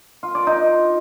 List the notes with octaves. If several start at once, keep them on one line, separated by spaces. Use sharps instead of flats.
F4
D5
D#4